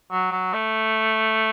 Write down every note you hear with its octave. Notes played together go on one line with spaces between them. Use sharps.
F#3
F#3
A3